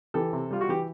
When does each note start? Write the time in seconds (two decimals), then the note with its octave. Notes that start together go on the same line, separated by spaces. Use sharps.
0.14 E3 G4 A4
0.33 C3
0.51 G3 F4
0.61 F#4
0.69 E3 G4